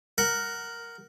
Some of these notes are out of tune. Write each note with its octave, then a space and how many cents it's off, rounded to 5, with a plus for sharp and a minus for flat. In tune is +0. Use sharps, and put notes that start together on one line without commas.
A#4 +0 F#5 +10